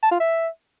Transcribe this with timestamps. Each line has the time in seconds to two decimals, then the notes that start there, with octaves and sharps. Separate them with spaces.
0.03 A5
0.11 F4
0.20 E5